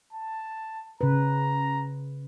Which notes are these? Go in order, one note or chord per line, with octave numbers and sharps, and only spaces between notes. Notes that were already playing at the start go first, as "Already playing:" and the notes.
A5
C#3 B4 A#5